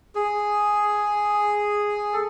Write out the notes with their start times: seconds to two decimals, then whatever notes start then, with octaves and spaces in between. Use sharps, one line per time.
0.15 G#4
2.14 A4